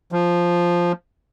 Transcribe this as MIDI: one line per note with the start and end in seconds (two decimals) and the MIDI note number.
0.12 0.92 53